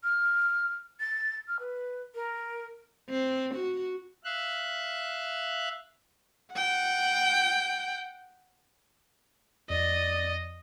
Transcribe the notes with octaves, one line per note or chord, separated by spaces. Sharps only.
F6
A6
F6
B4
A#4
C4
F#4
E5 F5 F#6
F#5 G5
F2 D5 D#5